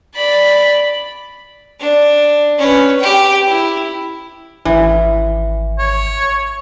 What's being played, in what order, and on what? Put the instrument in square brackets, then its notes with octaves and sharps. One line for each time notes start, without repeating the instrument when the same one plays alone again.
[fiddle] D5 B5
[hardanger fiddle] D4
C#4 B4
G4 G5
E4
[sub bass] G#1 [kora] E3
[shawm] C#5